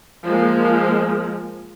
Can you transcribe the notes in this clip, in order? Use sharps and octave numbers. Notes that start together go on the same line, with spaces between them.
F3 G#3 A#3